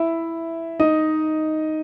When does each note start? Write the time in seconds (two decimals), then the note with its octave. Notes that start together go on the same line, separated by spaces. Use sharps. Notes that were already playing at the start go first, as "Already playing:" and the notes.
Already playing: E4 E5
0.80 D#4 D#5